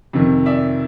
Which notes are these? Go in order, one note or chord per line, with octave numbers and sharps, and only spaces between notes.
F2 C3 D#3
D5 E5